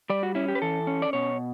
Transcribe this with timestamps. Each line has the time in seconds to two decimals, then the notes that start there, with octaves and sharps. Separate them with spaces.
0.10 G3 D5
0.23 F#4
0.35 C#4 E4
0.48 G4
0.55 B4
0.62 E3 A4
0.87 C#4
1.02 D5
1.13 B2 C#5